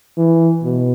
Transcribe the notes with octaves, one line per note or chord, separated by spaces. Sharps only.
E3
B2